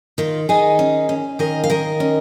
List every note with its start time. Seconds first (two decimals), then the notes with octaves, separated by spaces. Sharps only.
0.18 D#3 F4
0.49 D#3 D#4 G#4
0.79 C#4
1.09 C#4
1.39 D#3 A#4 D#5
1.64 F5
1.70 D#3 A#4 D#5
2.00 C#4